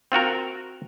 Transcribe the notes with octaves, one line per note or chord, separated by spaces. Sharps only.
C4 F4 F#4 A#4